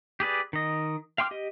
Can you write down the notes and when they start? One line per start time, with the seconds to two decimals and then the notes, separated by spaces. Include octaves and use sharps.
0.20 G4 G#4 B4 D5
0.53 D#3 D#5
1.18 F5 G5 C6 D6 F6
1.31 G4 D#5